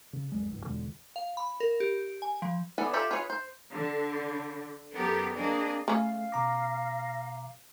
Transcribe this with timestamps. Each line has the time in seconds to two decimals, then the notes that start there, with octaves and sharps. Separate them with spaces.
0.13 C#3
0.32 A1 F2 G3 G#3
0.50 F#1 C#2 G#2 G3
0.66 E2 B2 D3 G#3
1.16 F5
1.37 B5
1.60 A#4
1.80 G4
2.22 G#5
2.42 F3
2.78 E3 B3 A4 D5 G#5
2.93 F4 G4 A4 D5 E5
3.11 F4 G#4 B4 C#5
3.30 C5
3.72 D3
4.94 F#2 B3 G4 A4 A#4
5.37 A#3 C4 D4 G#4 D#5
5.88 C#3 A3 C#4 F5
6.32 B2 A#5 D6 A#6